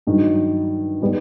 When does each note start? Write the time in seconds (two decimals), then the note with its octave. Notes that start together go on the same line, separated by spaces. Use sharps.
0.07 G2 D#3 F#3
1.02 D#3 G3 B3